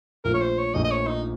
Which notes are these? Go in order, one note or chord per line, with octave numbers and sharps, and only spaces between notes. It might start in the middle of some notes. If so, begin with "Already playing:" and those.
A#1 A#2 F3 A3 A#4
C#5
C5
C#5
A#1 A#2 F3 A3 D#5
D#5
C#5
D#4